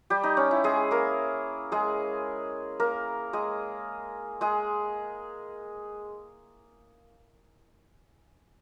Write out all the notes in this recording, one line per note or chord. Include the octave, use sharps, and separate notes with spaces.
G3 G4
D#4
C#4
E4
G#3 G#4
A#3 A#4
G#3 G#4
A#3 A#4
G#3 G#4
G#3 G#4